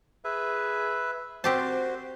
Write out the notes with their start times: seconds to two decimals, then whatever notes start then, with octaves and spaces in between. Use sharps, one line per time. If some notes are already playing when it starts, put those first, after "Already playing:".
0.25 G#4 B4 E5
1.44 C4 F#4 G4 C5 A5